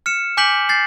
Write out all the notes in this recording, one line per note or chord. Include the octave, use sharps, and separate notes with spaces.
F6 C#7 E7
G#5 D6 G6 B6 C#7 F#7
G6 A6 C7